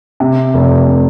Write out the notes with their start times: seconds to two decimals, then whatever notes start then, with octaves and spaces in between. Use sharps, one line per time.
0.20 C3
0.54 F1
0.87 C3